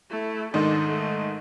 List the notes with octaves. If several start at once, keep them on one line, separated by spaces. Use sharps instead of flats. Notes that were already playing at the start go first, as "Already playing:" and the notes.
A3 E4
G#2 D#3 D4 D#4 A4
A3